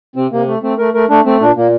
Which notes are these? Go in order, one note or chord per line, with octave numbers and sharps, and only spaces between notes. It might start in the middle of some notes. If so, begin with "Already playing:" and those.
C3 C4
C3 A#3
A3
A3 C4
A3 A#4
A3 A#4
A3 D4
A3 C4
A#2 D4
A#2 A#3